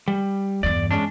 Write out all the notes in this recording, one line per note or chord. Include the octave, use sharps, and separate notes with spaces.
G3
E2 G2 D5
G#3 C#4 D4